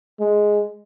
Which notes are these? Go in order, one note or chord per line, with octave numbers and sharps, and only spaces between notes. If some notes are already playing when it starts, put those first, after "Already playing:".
G#3